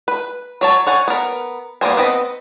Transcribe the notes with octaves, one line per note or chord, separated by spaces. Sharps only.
B4
F#3 C#5 A5
C#5 F#5 G#5 A5
B3 A#4
G3 A#3 B3 C5 G#5
B3 C4 B4 D#5